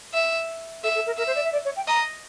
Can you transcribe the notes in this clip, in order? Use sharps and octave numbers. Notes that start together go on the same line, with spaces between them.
E5
A4 E5
A4
A#4
A#4 E5
C5
D5
E5
D5
C#5
G5
D#5 A#5